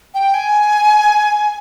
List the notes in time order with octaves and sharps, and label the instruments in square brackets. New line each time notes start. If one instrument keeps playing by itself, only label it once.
[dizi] G5
G#5